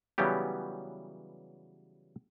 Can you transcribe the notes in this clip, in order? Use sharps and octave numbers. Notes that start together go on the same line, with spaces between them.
C#3 E3 F#3 G3 B3 G4